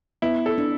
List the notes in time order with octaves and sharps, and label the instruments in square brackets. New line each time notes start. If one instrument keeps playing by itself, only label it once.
[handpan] B3 [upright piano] E4
[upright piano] A4
[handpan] D4